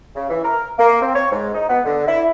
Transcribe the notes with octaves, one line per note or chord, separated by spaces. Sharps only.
C#3
E3
A#4
A#3
C4
C#5
G#2
D#4
B3
D3
E4